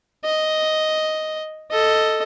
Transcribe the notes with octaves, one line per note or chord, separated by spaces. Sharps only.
D#5
A4 D#5